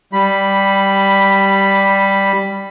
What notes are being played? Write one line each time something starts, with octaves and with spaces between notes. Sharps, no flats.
G3 B5